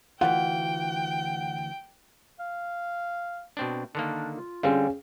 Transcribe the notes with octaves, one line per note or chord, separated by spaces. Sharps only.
D2 E3 F4 F#5 G5
F5
B2 C4 D4
D3 D#3 A#3 D4
F4
D3 G3 C4 C#4 G#4 F5